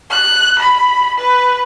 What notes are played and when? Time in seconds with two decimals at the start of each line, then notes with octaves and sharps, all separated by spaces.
0.10 F#6
0.59 B5
1.18 B4